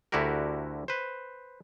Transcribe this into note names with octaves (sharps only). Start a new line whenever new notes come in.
D2 D3 E4 F#4 G4 A#4
B4 C5